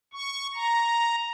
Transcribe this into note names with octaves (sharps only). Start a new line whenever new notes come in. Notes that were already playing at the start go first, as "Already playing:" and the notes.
C#6
A#5